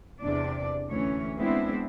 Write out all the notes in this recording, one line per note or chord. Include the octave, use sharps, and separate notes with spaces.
E2 C3 D4 D5
D2 E3 C#4 C#5
G#3 B3 C4 D4 E4